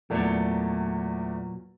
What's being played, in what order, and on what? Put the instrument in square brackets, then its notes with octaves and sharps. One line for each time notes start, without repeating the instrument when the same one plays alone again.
[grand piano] E2 A3 D5 [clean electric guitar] A#2 F#3